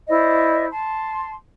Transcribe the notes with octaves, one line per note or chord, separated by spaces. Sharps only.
E4 C5 D5 D#5
A5 C6